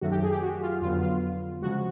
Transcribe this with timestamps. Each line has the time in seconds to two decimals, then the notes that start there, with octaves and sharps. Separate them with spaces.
0.01 F#2 D#3 F#3 A3 F#4
0.11 G4
0.23 G#4
0.31 G4
0.42 F#4
0.63 F4
0.82 F2 D3 F#3 B3 F4
1.02 F4
1.62 C#3 F3 G#3 F#4